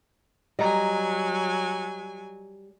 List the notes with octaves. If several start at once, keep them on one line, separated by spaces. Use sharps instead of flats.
F#3 G3 D#5 G#5 A#5